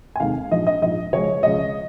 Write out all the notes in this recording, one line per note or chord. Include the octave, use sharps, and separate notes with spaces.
G#5
F1 D#2 D#3 G#3 F5
A#1 G#2 F3 D#5
D#5
A#1 G#2 F3 D#5
C#2 C#3 F3 G#3 C#5
C#2 C#3 F3 G#3 D#5